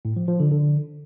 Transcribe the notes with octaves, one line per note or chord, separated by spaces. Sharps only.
A2
F3
F3
D3
D3